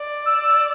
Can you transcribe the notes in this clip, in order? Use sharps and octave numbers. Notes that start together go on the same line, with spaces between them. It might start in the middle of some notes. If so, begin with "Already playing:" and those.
Already playing: D5
E6